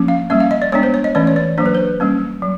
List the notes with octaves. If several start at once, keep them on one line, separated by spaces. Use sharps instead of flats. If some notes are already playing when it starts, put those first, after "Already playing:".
Already playing: F3 A#3 C#4
F5
G3 A#3 C#4 E5
F5
D#5
D5
G#3 B3 D4 C#5
C5
C#5
D#5
E3 A3 C#4 D5
C#5
D5
F#3 A#3 D4 C5
B4
C5
G3 A#3 C#4
F#3